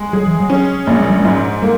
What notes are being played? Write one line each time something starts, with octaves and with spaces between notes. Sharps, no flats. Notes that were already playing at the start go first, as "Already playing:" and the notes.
Already playing: G#3
F#3 G#4
E3
F#3
C#4
A#1 A#3
G#3
F#3
G#2 G#3
G#3 A#3